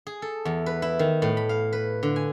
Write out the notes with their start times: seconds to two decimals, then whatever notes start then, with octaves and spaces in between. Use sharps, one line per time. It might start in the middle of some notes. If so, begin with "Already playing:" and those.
0.07 G#4
0.22 A4
0.45 E2
0.66 B4
0.82 E4
0.99 D#3
1.22 A2
1.37 B5
1.49 F5
1.73 B4
2.03 D3
2.16 G#5